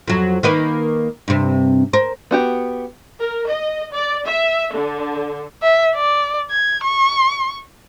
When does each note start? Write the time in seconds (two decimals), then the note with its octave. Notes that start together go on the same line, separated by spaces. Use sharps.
0.07 F2 F#3
0.43 D#3 A#3 B4
1.28 G2 C3
1.93 A#4 C5
2.31 B3 F#4 G4
3.20 A#4
3.50 D#5
3.93 D5
4.25 E5
4.74 D3
5.63 E5
5.95 D5
6.50 G#6
6.84 C#6